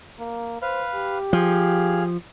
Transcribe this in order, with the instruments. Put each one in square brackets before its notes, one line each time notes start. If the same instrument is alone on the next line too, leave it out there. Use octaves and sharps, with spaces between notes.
[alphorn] A#3
[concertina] B4 F5 [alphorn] C5
[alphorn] G4
[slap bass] F3 [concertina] G#4 F5